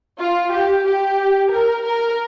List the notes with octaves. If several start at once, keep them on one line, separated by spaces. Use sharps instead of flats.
F4
G4
G4
A#4
A#4